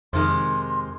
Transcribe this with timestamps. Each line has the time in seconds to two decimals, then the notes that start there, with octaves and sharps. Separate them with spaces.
0.13 F2 C3 D#3 G#3 C6